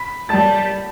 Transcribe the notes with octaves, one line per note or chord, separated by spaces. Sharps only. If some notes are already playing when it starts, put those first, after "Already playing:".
Already playing: B5 B6
G3 A5 A6